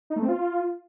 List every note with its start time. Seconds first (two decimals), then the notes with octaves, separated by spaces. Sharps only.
0.10 D#4
0.16 A3
0.22 C4
0.28 F4